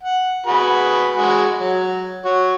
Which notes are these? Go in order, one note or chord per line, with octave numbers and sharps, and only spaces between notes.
F#5
F#4 G#4 B4
G#3 F#4 G#4
F#3
F#4 C#5